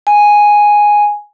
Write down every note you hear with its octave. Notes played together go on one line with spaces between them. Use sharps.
G#5